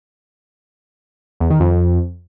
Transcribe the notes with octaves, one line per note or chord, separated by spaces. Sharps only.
E2
D#3
F2